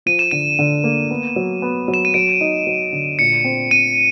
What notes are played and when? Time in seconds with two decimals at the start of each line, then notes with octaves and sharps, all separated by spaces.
0.06 F3 D#7
0.19 E7
0.31 D3 D#7
0.59 D3
0.84 A#3
1.11 B3
1.36 F#3
1.62 B3
1.88 F#3
1.94 E7
2.05 D#7
2.14 F#3 D7
2.41 D#4
2.67 F#3
2.93 D3
3.19 A#2 C#7
3.44 C4
3.71 C4 D#7